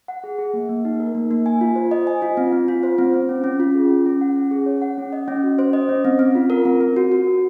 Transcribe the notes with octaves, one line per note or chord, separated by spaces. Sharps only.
F#5
G#4
G#4
A#3
A#3
D#4
A#4
A#3
A#3
G#5
F4
C5
D#5
G#5
F4
C4
C4
F4
C5
C4
C4
C#4
C#4
F4
G#4
C#4
C#4
F#5
C#4
G#4
C#5
F#5
C#4
D#5
C#4
F#4
C5
D#5
C#4
C4
C4
F4
A#4
C4
C4
F#4
F#4
A#4